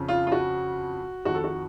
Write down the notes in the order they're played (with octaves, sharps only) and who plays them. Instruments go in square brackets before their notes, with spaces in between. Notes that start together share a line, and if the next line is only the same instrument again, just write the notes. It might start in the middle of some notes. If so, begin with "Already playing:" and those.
Already playing: [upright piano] F2 C#3
F4
F4
F#4
F2 D#3 F#4
A4
F#4